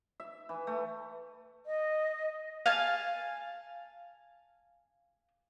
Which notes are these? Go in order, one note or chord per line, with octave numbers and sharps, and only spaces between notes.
E5
E3
A3
D#5
F5 G#5 A5